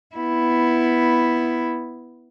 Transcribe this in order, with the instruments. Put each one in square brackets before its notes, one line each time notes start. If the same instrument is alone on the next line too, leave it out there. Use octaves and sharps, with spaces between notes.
[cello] B3 E4